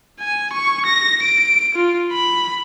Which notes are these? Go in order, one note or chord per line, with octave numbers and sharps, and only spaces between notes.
G#5
C#6
A#6
D7
F4
B5